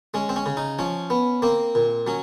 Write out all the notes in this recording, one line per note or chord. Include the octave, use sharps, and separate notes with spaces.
G#3 C#4
C4
C#4
C#3
D#4
F3 C#4
B3
A#3 C4
A#2
F#3 C#4